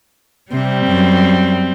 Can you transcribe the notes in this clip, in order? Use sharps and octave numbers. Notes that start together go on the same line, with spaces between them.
C3 G3 C4
F#2